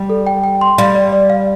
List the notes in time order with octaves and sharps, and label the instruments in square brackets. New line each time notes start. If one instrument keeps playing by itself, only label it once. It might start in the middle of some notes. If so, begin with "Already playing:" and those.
Already playing: [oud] G3
[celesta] A4
G5
G5
C6
[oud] G3 [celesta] F5
[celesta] D5
D5
F5